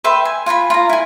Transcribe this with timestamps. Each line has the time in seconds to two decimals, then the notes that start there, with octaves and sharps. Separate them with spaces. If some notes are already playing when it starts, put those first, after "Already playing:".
0.04 B4 E5 G5 C6
0.25 G#5
0.46 F4 G#5 A#5 B5
0.70 F4 A#5
0.89 E4 G#5